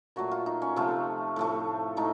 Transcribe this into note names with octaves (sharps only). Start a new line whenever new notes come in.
A#2 F#3 A3 F#4
F4
D#4
C#4
C3 F3 A3 F4
A2 F3 A3
A2 F3 A3 D#4